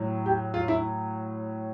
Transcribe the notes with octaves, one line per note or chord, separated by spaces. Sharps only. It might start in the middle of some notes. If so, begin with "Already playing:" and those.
Already playing: A2 F#3
G4
F4
E4